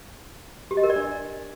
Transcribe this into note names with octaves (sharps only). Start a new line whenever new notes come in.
G4
D#5
A#4
D5
D4